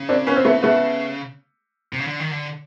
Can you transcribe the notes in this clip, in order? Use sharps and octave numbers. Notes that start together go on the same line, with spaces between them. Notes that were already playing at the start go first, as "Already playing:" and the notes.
Already playing: C#3
C4 D4
B3 C#4
C4
A3 B3
A3 B3
C3
C#3
D3
D#3
D3